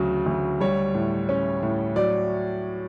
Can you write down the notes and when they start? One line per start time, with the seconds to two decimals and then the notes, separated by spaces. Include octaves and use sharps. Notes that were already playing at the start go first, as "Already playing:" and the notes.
Already playing: D2 C#3 F#3
0.26 D2
0.60 G3 C#5
0.94 A2
1.29 C#4
1.63 A2
1.96 F#3 D5